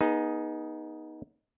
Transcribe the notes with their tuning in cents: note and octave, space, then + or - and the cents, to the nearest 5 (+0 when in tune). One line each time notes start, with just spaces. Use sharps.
B3 -30 D#4 +5 G#4 +0